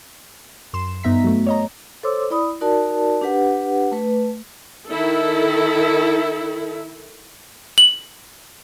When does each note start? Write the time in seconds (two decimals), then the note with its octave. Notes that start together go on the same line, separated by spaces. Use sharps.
0.73 F#2 C6 E7
1.03 G2 B3 D#4 E5 A#5 B6
1.24 F#3 A3
1.46 C#5 D#5 A#5
2.03 A4 C5 C#5 C6 D6 E6
2.30 E4 D5 B5 D#6
2.61 D#4 F#4 A#4 D5 A5
3.21 D4 G4 B4 F#5
3.92 A3 B4
4.88 D#3 E4 A4
7.78 F#7